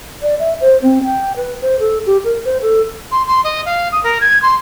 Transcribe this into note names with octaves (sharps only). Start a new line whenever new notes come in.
D5
E5
C5
C4
G5
B4
C5
A4
G4
A#4
C5
A4
C6
C6
D#5
F5
D#6
A#4
G#6
C6